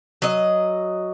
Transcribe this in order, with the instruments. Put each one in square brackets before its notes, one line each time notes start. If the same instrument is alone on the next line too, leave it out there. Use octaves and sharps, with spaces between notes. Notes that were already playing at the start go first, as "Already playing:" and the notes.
[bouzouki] F#3 D#5